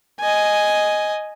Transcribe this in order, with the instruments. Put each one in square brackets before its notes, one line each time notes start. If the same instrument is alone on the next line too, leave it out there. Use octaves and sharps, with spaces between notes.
[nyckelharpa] D#5 G#5